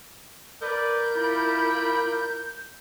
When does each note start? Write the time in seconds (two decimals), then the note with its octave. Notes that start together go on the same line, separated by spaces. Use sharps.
0.61 A#4 B4 D5 G6
1.15 E4 F4 D5 B5